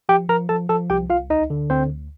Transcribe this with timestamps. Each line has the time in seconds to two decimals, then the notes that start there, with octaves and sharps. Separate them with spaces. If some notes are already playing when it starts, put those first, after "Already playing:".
0.09 F3 G4 G5
0.29 F3 A#4 A#5
0.49 F3 A4 A5
0.69 F3 A4 A5
0.90 C2 G4 G5
1.10 C2 F4 F5
1.30 D2 D#4 D#5
1.50 D3
1.70 D2 C4 C5
1.90 D2